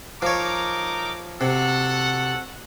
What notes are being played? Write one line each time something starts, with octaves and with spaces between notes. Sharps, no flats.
F3 D#4 A#4 C#5 D6
C3 F#4 A4 F#5